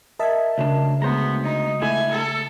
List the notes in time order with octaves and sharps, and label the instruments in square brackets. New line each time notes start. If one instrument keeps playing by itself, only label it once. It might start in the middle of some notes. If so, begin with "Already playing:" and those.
[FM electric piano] A#4 D#5 A5 [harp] E5 G#6
[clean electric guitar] D2 D4 [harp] C#3
[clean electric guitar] D2 C5 A#5 [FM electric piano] G#3 [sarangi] B3
[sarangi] D#4
[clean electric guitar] D3 A3 E4 [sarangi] G#5
[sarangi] A4